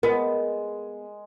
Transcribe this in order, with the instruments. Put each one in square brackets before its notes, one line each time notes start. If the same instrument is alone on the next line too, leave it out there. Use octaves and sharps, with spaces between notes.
[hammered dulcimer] G#3 [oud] B3 [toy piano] A#4